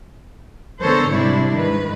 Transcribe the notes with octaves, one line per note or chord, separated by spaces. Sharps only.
D3 B3 A4 A#4 C5 C#5
G#2 C3 G3 D4 E4
G#2 D#3 B4